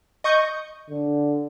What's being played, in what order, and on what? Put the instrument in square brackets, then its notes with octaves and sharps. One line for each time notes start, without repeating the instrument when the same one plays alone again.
[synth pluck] D#5 C#6 G6
[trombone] D3